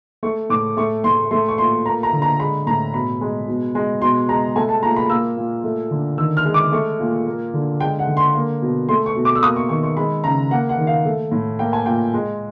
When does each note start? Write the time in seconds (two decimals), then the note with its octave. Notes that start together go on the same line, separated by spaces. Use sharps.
0.23 A3 C#6
0.50 A2 D6
0.77 A3 C#6
1.04 A2 C6
1.31 A3 C6
1.48 C#6
1.58 A#2 C6
1.85 A#3 A#5
2.03 A#5
2.13 D3
2.22 A#5
2.39 G#3 B5
2.67 A2 A#5
2.94 B2 B5
3.21 G#3
3.48 B2
3.75 G#3
4.01 B2 C6
4.29 G#3 A#5
4.55 A3 G#5
4.69 A5
4.83 A#2 A#5
4.96 B5
5.10 A#3 E6
5.37 A#2
5.64 A3
5.91 D3
6.18 D#3 E6
6.37 F6
6.45 G#3
6.54 D6
6.72 A3 C#6
7.00 A#2
7.26 A#3
7.54 D3
7.80 G#3 G5
7.99 F#5
8.07 D3
8.17 C6
8.34 A#3
8.62 B2
8.89 A3 C6
9.06 C#6
9.16 B2
9.25 D6
9.35 E6
9.42 A#3 D#6
9.56 C#6
9.69 D#3 C#6
9.83 C#6
9.97 G#3 B5
10.24 C#3 A#5
10.51 A#3 F#5
10.69 F#5
10.78 D#3
10.87 F5
11.05 A3
11.32 A2
11.59 A#3 G5
11.73 G#5
11.86 A#2 G5
12.14 G#3